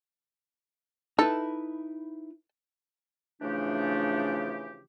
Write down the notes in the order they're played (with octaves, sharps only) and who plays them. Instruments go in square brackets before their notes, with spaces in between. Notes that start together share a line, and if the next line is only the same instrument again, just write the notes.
[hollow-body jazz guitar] D#4 E4 B4 [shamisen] A4
[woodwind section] C#3 E3 F3 A3 D4 G4